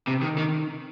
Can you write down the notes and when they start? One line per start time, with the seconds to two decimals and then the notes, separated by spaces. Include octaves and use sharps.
0.07 C3
0.22 D#3
0.38 D#3